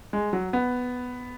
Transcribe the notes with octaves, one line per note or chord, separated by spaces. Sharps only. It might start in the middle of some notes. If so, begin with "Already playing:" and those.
G#3
F#3
B3